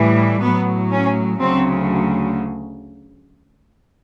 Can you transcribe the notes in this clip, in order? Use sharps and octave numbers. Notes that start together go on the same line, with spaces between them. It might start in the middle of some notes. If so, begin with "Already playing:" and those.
Already playing: A2 E3 G3
A2 F#3 B3
C#4
D2 C#3 F#3 C4